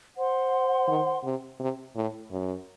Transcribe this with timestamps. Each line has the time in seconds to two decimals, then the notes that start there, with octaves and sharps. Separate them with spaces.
0.16 C5 F#5 C6
0.88 D#3
1.24 C3
1.60 C3
1.96 A2
2.32 F#2